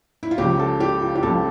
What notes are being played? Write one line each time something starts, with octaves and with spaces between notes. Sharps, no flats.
E4
F4
C#2 C#3 F3 G4
A4
G4
F4
G4
C#2 C#3 F3 A4